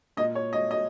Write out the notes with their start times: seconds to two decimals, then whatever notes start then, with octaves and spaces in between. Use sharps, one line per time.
0.17 A#2 D#5
0.35 C#5
0.53 D#5
0.71 D#5